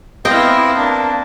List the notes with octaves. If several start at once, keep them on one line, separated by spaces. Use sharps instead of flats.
B3 C4 E4 D#5 F5 G5
A#3 D4 A5